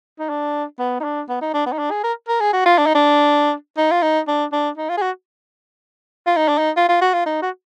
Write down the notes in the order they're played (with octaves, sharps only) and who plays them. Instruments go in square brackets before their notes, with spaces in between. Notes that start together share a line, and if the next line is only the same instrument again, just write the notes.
[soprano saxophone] D#4
D4
B3
D#4
D4
B3
D#4
D4
B3
D#4
D4
G#4
A#4
A#4
G#4
F#4
F4
D4
D#4
D4
D#4
F4
D#4
D4
D4
D#4
F4
G#4
F#4
F4
D#4
D4
D#4
F4
F4
F#4
F4
D#4
F#4